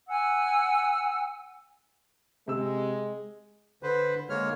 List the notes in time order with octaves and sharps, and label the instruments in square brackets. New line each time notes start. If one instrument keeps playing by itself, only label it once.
[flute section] F#5 G#5 E6
[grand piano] C3 E6 [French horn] G#3
[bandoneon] D3 B4 C5
D3 G#3 A#3 C#5 F6